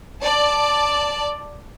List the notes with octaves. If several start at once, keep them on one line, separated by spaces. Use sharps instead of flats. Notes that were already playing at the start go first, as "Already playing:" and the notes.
D5 A5